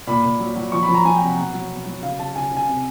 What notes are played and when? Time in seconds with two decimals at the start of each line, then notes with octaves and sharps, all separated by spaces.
0.07 A#2 B5
0.24 A#2
0.40 F#3
0.56 F#3
0.72 F3 C#6
0.83 B5
0.89 F3
0.94 A#5
1.05 F3 G#5
1.16 G5
1.21 C3
1.27 F#5
1.38 B2 F#5
1.54 F#3
1.70 B2
1.86 F#3
2.02 C#3 F5
2.19 C#3 A5
2.35 C#3 G#5
2.51 C#3
2.57 G#5
2.68 C3